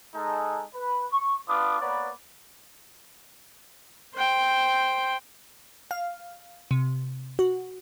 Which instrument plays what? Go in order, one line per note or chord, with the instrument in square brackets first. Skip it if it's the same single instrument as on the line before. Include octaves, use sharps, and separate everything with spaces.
[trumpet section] G#3 D#4 A4
B4
C#6
B3 D4 F4 B4 D6 D#6
A#3 B3 B4 C#5 D5
[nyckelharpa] C5 G5
[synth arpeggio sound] F5
C3
F#4